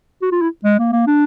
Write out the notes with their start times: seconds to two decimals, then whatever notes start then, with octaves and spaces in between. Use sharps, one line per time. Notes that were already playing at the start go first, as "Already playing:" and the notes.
0.22 F#4
0.32 F4
0.42 E4
0.65 G#3
0.79 A#3
0.93 A#3
1.07 D4